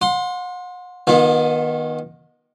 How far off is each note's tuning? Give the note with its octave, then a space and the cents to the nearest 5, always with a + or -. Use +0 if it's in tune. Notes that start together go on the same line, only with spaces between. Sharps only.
F#5 -40 C6 +5
D#3 +0 B3 -35 F4 +35